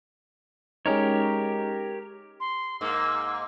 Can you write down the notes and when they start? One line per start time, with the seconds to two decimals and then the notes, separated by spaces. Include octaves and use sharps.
0.86 G#3 C#4 D#4 G4 A#4 C#5
2.40 C6
2.81 G#2 A#3 E6